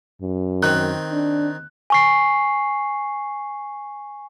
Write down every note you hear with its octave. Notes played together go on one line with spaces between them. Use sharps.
F#2
D#3 C4 F#6
D4
G#5 C#6 C7